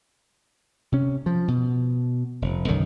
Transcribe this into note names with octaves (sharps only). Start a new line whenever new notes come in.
C3 C#4
F3
B2
F1
B1 F#2 D3 D#3